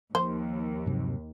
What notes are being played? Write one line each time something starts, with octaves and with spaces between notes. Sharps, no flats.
D#2 F3 C5
G2 C3 F#3